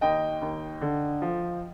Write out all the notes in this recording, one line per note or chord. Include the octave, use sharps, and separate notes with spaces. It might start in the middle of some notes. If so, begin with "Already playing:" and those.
D#2 D#5 G5
D#2
D3
F3